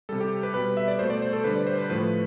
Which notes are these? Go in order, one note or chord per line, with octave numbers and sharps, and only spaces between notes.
C3 G3 A4
G4
B4
B2 G3 B4
E5
D5
B2 A3 C5
D5
C5
A4
D3 G3 B4
D5
C5
B4
A2 F3 A3 B4